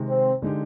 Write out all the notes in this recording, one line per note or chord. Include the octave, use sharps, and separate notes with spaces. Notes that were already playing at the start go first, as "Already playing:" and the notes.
Already playing: C3 D#3 G#3
C4
D3 G#3 D#4 G4